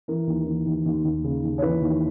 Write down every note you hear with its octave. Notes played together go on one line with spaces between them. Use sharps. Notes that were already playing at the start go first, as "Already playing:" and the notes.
E3 A#4
D#2
E3
D#2
D#2
D#2
C#3
D#2
C#5
E3 B4
D#2